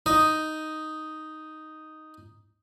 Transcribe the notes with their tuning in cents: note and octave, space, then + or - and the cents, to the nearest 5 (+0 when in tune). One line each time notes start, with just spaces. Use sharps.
D#4 +0 D#5 +0